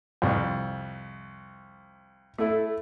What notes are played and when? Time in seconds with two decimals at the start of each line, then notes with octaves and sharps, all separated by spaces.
0.22 C2 F2
2.38 A3 E4 A4